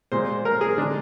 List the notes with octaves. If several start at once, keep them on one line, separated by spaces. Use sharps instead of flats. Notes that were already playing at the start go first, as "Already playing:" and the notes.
A#2 G#3 C5
A#4
G#4
D3 G#3 D4